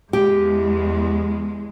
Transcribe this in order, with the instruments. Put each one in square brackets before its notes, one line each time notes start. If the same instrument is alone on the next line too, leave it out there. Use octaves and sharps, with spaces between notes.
[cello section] E2 G#3 [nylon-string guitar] G4